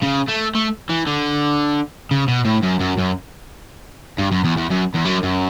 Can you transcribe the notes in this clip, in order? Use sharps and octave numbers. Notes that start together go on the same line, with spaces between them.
C#3
A3
A3
E3
D3
C#3
B2
A2
F#2
F#2
F#2
G2
F#2
E2
E2
F#2
E2
F#2
F#2